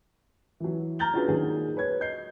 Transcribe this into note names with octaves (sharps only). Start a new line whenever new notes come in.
E3 F#3
A#5 F6 G6 A6 F#7 G7
C#4 D4 F4 F#4 G#4 B4
A#2 D#3 F#3 F#4 G#4
B4 C#5 G#6
D#5 G6 C7